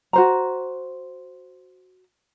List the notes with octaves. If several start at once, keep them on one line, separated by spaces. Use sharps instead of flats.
F#4 C5 A#5